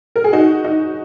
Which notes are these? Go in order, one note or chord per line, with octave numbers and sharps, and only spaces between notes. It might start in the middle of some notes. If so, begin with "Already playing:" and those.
A#4
G#4
D#4 F#4
D#4 F#4